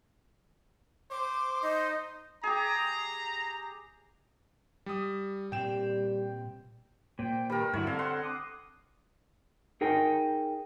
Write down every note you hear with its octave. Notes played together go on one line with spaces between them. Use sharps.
C5 D6
D#4
G4 G#4 A#5
G3 D#6
A#2 G3 C4 G5 E7
A#2 C5 G5
G2 D#3 G3 A#4
G2 D3 E4 F#4 C#5
C4 A4 F5
F#5 C6
D6 D#6
D#4 G#4 A#4 G5